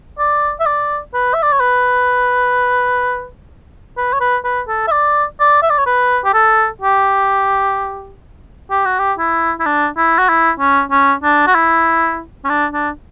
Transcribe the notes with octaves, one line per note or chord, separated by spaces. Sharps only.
D5
E5
D5
B4
E5
D5
C#5
B4
B4
C#5
B4
B4
A4
E5
D5
D5
E5
D5
C#5
B4
G4
A4
G4
G4
F#4
G4
E4
E4
D4
E4
F#4
E4
C#4
C#4
D4
F#4
E4
C#4
D4
D4